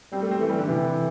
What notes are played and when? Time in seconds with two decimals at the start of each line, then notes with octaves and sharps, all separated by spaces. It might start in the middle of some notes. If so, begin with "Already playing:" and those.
0.13 G3 C4
0.22 A3
0.31 C4
0.41 E3 A3
0.50 G3
0.59 D3
0.68 C3 E3